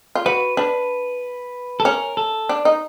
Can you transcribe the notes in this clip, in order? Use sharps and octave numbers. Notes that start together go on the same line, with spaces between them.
F4
F#4 B4
D4 B4
A4
C#4 A#4
A4
D4
D#4